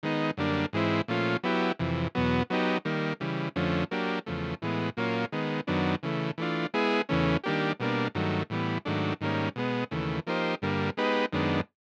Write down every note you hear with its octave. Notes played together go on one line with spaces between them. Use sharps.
D#3 G#3 B3 D#4
F#2 D3 G3 A#3 D4
G#2 E3 G#3 C4 E4
A#2 F3 A3 C#4 F4
F#3 B3 E4 G4
F2 C3 E3
E2 B2 F#3 B3
F#3 B3 D#4 G4
D#3 G3 A#3
C#3 E3 G3
F2 D3 F3 A3 C#4
F#3 A#3 D4 G4
E2 C#3 F3 A3
A2 E3 G#3 B3
A#2 F#3 A#3 C#4 F4
D#3 G#3 B3
F#2 D#3 F#3 B3 D4
C#3 E3 A3
E3 A3 D4 F4
G#3 B3 E4 G#4
E2 C#3 E3 A3 C#4
D#3 G3 A#3 D4 G4
B2 G3 A#3 D4
G2 D#3 F#3 A3
A2 E3 G3 B3
G#2 D#3 F#3 A3 D4
G#2 D#3 G3 A#3 C#4
B2 G#3 B3
D#2 C#3 E3 A3
F3 A#3 D#4 G4 C5
G2 D3 G3 A#3
G#3 B3 D#4 G4 B4
F#2 D#3 G#3 B3 D4